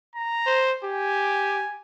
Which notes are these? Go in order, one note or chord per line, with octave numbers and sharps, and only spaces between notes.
A#5
C5
G4 G#5